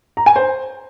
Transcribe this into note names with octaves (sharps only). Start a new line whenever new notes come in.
A#5
G#5
C5